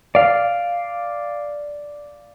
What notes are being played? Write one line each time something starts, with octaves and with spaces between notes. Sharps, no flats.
D5 F5